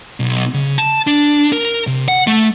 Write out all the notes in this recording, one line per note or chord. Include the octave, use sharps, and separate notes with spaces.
B1
C#3
A5
D4
A#4
C3
F#5
A3